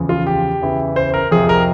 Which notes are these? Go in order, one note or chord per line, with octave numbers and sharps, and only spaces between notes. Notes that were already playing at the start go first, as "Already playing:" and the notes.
Already playing: E2 C#3 F3
F4
G4
E2 C#3 E3
C5
A#4
F2 C3 F3 G#4
A#4